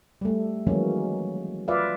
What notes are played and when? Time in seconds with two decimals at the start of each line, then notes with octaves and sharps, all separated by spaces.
0.21 G3 A3
0.67 D#3 E3 F#3 G#3 A#3 C#4
1.68 F4 B4 D5 E5 F5